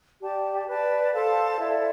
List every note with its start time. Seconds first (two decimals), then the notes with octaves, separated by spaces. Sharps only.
0.20 G4 D5 A5
0.66 B4 D5 A5
1.13 A4 C5 F5 A5
1.59 E4 A4 D5